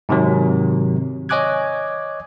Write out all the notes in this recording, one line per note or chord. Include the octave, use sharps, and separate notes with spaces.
G#2 C3 D#3 F#3
C#5 D#5 G#5 D6 F#6 G#6